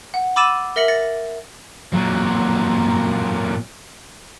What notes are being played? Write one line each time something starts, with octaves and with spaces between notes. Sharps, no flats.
F#5
B5 D6 E6 A6 D#7 E7
A#4 E5 A#6 C#7 F#7
A6 A#6 C#7
A#2 F#3